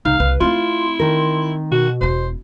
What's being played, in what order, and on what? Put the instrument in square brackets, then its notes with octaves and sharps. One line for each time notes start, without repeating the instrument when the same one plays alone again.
[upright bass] C2 [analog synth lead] D#4 [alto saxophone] F5
[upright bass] C2 [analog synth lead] B4
[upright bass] A3 C4 [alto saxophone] E4 [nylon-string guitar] F4 [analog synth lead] C6
[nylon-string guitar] D#3 A#4
[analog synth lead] B2 [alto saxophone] F#4
[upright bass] E1 E4 [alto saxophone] C5